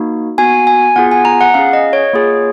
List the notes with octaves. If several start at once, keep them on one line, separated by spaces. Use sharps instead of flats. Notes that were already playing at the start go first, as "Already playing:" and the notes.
Already playing: A#3 D#4 F#4
B3 F#4 G#5
G#5
B3 F4 G#4 F#5
G#5
A#5
F#5
C#4 G#4 F5
D#5
C#5
A#3 F4 G#4